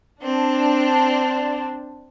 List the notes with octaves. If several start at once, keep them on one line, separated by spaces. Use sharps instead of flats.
C4 D4